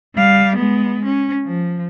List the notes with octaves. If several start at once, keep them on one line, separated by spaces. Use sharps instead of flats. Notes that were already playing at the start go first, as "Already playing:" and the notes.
G3 F5
G#3 B3
C#4
F3